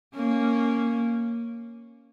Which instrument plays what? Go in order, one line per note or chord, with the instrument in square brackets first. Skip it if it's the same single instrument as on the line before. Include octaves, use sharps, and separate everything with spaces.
[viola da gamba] A#3 C#4